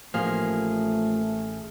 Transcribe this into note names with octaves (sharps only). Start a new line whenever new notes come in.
A1 F3 A3 A#3 G#4 F6